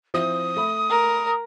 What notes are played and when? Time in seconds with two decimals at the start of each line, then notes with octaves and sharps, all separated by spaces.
0.14 F3 C4 E4 D#6
0.56 A3 B5
0.90 A#4